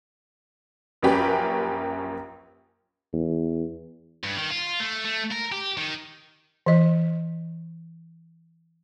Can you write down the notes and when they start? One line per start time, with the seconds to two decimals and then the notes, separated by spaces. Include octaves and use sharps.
1.02 A#1 F#2 A#3 C#4 G4 B4
3.13 E2
4.23 G2
4.37 D#3
4.50 F4
4.80 A3
5.05 A3
5.32 A#4
5.52 G4
5.77 D#3
6.66 E3 D#5